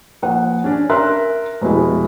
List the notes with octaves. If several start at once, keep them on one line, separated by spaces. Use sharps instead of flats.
A#1 F#5
C#4 D4
A#4 E5 C6 F#6
F1 B2 G#3 E4